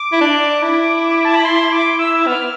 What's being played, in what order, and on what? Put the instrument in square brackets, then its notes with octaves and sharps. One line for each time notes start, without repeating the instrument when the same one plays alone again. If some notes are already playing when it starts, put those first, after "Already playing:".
Already playing: [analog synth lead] D6
[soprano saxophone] E4
D4
E4
[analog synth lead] A5
B5
C6
D6
E6
[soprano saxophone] B3 [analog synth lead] F6